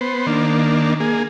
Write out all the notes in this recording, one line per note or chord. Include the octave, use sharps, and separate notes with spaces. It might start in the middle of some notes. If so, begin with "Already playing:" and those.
B3 C5
D#3 A#3 D4
A#3 G#4